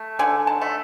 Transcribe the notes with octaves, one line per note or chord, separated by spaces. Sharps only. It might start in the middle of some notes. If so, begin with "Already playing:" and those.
Already playing: A3
D3 G#5
A5
A3